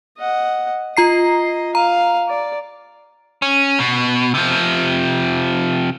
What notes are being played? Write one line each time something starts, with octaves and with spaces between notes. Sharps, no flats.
D#5 F#5
F4 D#5 A#5 C7
F5 A#5
D5
C#4
B2
C3 F3